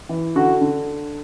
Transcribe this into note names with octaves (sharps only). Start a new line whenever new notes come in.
E3
D3 F#4
D3